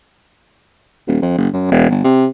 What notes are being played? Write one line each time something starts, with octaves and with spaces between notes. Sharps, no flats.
D#1
F2
F#1
F#2
E1
G1
C3